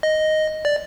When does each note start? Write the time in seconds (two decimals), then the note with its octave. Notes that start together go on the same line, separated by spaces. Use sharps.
0.03 D#5
0.65 D5